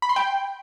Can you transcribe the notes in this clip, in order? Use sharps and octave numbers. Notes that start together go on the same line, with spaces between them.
B5
C6
G5